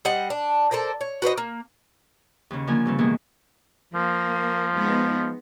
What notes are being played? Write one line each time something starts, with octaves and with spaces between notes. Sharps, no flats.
G3 C5 D#5 F#5
D4
A4 A#4 C5 D5
C#5
F#4 B4 C5 D#5
A#3
D#2 C#3
D3 F3 A#3 G#5
G2 C#3 C4
B2 D#3 E3 G#3 A#3 E4
F3 A#3
G#3 B3 D#4